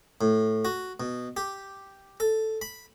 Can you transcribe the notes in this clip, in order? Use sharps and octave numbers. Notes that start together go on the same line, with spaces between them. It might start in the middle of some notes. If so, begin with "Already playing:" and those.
A2
F#4
B2
G4
A4
B5